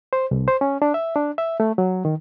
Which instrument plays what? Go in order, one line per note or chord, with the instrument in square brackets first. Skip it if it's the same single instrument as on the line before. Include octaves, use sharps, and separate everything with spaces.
[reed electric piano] C5
C2
C5
C#4
D4
E5
D4
E5
A3
F#3
D#3